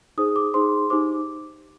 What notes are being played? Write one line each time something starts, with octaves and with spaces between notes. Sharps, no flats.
D#4 G#4 C5 D#6
D6
D#4 G#4 C5 C6
D#4 G4 C5 D6